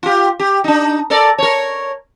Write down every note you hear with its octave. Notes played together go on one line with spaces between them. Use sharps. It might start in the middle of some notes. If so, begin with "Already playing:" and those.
F4 G4
G4
D4 D#4
A4 A#4 D5
A#4 C#5